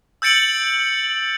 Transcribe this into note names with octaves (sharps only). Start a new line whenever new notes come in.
E6 G6 A6 C#7 D7 F#7